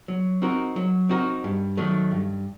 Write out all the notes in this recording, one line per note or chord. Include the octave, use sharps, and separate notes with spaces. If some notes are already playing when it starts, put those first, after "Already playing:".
F#3
C4 D#4 F#4 A#4
F#3
C4 D#4 F#4 A#4
G2
D#3 F#3 A3
G2